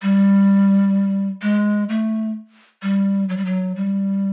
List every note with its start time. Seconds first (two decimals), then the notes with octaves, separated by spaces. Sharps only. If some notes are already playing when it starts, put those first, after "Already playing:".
0.02 G3
1.42 G#3
1.89 A3
2.82 G3
3.29 F#3
3.37 G3
3.45 F#3
3.76 G3